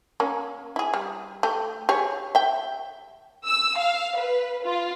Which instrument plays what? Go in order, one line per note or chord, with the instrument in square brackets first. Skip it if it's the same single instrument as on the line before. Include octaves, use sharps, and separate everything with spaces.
[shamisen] A#3 C#4
E4 G#4
G3
A3 G4
G4 G#4 C#5
E5 G5
[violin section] E6
F5
B4
F4